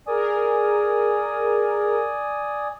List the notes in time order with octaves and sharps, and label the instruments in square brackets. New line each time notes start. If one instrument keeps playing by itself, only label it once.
[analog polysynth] G#4 A#4 [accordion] D5 G#5 D#6